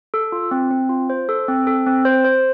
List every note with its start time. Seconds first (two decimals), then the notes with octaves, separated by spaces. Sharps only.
0.14 A4
0.32 F4
0.51 C4
0.71 C4
0.89 F4
1.10 C5
1.29 A4
1.48 C4
1.67 A4
1.86 C4
2.05 C5
2.24 C5